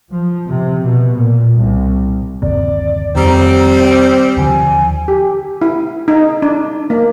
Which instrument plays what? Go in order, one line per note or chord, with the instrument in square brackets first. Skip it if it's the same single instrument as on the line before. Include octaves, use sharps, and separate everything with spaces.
[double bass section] F3
C3
B2
A#2
C2
[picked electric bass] G1 D#2 C3 [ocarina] D5
[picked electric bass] F2 D#3 [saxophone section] G3 C4 [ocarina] A#5
[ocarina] C5
[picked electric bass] D#2 D3 F3 [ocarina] G#5
[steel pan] G4
E4
D#4
D4
A#3